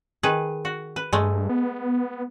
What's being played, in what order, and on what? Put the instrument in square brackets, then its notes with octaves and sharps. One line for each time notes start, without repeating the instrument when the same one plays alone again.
[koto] D#3 G#4 B4
F#4
B4
[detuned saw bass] G2 [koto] G#3 A3
[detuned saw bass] B3